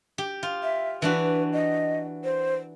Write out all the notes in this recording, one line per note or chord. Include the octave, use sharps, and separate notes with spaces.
G4
F4
E5
E3 D4 F#4 B4
D#5
C5